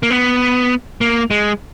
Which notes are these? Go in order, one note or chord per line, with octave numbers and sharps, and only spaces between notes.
A#3
B3
A#3
G#3